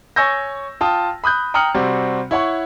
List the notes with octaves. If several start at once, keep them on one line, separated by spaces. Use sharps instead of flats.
C#5 G#5 C#6 E6 G6 A#6
F4 G5 A5 D#6
B5 D#6 F#6 G6
G5 A#5 D#6 F6 C#7 F#7
C3 G3 C4 F#4
E4 C#5 F#5 C#6